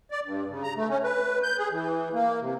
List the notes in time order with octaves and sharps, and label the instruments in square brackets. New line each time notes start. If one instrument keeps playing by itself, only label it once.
[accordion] D5
G2
C#3
A#5
A3
C#4
B4
G6
G#4
E3
A#3
C3